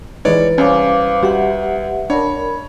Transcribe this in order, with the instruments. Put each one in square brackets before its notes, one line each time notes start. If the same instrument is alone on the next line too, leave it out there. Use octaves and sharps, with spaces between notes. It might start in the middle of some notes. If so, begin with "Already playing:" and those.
[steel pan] E3 G#3 D#4 [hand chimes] B4 [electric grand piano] C#5 D5
[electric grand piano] C2 [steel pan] C#4 [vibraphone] C5 F5 D6
[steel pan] G3 F#4 [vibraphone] G4 E5 F#5
[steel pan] D4 [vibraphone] A#4 B5 [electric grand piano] C#5